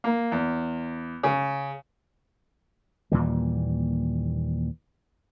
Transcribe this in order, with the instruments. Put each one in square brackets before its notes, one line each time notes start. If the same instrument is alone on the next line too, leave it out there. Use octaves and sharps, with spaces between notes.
[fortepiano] A#3
E2
C#3
[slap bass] D#2 A#2 E3 G3